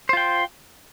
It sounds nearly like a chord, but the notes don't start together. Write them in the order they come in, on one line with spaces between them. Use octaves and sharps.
C5 F4 G5